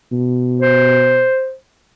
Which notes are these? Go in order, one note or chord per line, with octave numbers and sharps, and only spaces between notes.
B2
C5